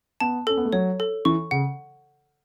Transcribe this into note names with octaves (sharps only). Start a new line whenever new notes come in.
B3 A5
C#4 A4
B3
A3
F#3 C#5
A4
E3 C#6
C#3 F#5